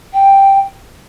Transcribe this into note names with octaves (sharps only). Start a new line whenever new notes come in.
G5